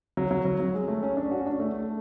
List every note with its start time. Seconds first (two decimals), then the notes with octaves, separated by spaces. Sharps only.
0.17 F#3
0.31 F#3
0.45 F#3
0.60 F#3
0.74 G#3
0.88 A3
1.03 C#4
1.17 D4
1.31 F#4
1.39 C#4
1.46 D4
1.60 A3
1.74 A3